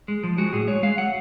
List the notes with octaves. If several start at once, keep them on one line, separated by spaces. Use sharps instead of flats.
G#3
F3
G#3 F#4
A2 G#4
G#3 C#5
G#3 F5
F#3 F#5